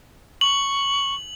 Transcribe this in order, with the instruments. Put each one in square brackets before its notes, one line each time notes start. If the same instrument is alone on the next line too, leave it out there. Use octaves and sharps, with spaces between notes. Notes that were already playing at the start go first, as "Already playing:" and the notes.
[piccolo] C#6 [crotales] F#7